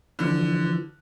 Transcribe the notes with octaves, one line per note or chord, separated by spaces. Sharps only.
D3 E3 F3